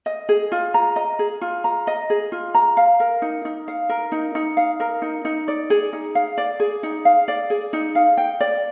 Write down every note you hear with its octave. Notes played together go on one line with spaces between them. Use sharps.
D#5
G#4
F4
A#5
D#5
G#4
F4
A#5
D#5
G#4
F4
A#5
F5
A#4
D#4
D#4
F5
A#4
D#4
D#4
F5
A#4
D#4
D#4
D5
G#4
D#4
F5
D5
G#4
D#4
F5
D5
G#4
D#4
F5
G5
D5